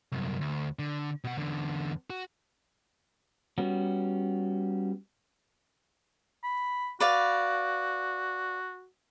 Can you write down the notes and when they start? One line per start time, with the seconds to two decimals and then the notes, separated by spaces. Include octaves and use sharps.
0.12 C2 F#2
0.41 D2
0.79 D3
1.24 B2 F#5
1.38 E2 D3
2.10 F#4
3.58 G3 B3 C#4 F#4
6.44 B5
7.00 F#4 B4 D5 F5